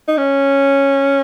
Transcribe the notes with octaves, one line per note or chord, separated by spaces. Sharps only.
D#4
C#4